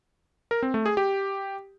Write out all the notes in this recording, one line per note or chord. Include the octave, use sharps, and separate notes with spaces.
A#4
C4
A3
G#4
G4